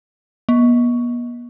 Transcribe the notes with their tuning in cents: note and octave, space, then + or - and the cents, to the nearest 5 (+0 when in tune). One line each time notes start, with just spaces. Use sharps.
B3 -40